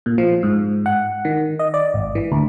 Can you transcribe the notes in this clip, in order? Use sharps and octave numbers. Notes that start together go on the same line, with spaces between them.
A#2
F3
G#2
F#5
D#3
D#5
D5
G#1
E3
D2